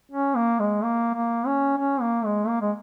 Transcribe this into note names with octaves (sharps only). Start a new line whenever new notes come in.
C#4
A#3
G#3
A#3
A#3
C#4
C#4
A#3
G#3
A#3
G#3